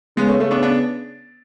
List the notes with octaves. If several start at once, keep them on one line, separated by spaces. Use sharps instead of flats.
C#3 G#3 B3
A3 C#4
A3 C#4
B3 D4
B3 D4